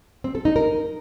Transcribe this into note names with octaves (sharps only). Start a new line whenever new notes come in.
C4
A4
D#4
A#4